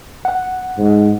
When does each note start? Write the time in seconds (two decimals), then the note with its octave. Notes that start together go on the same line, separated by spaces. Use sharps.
0.25 F#5
0.78 G#2